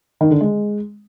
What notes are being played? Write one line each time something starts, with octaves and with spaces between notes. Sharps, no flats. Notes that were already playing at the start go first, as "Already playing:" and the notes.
D#3
D3
G#3